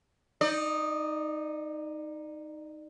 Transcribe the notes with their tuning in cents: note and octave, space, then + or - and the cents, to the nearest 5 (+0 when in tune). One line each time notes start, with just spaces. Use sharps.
D#4 +0 D5 +30